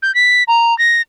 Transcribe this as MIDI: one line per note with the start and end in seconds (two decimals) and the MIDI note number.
0.02 0.14 91
0.15 0.43 95
0.48 0.76 82
0.78 1.02 94